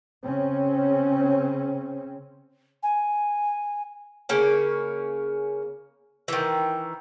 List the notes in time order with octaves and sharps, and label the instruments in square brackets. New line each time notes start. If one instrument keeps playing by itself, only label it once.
[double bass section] C#3 C4 C#4
[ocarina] G#5
[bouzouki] C#3 A#3 C#4
D#3 E3